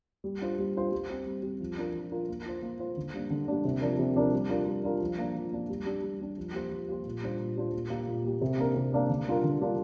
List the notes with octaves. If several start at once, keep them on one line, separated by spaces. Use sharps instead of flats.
G3
D4 F4 C5
G3
D4 F4 C5
G3
C4 G4
G3
C4 G4
F3
D4 F4 A#4
F3
D4 F4 A#4
A#3
F4 C5
A#3
F4 C5
D3
G3 A#3 D4
D3
G3 A#3 D4
C3
F3 D4 A#4
C3
F3 D4 A#4
G3
D4 F4 A#4
G3
D4 F4 A#4
F3
A#3 D4
F3
A#3 D4
G3
D4 G4
G3
D4 G4
F3
A#3 G4 C5
F3
A#3 G4 C5
A#2
G3 D4 F4 C5
A#2
G3 D4 F4 C5
A#2
A#3 G4
A#2
A#3 G4
C3
A#3 D4 A#4
C3
A#3 D4 A#4
D3
G3 D4 F4 A#4
D3
G3 D4 F4 A#4